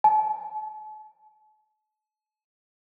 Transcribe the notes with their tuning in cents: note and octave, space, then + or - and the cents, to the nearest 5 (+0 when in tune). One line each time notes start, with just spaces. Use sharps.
A5 -40